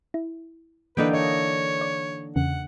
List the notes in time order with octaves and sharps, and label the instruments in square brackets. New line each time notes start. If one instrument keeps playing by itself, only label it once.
[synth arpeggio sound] E4
[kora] D3 D#4 G5 [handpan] E3 A#3 D4 [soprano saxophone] B4
[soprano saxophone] C#5 [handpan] D#5
[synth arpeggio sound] D5
[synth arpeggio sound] E2 C#3 [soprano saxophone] F#5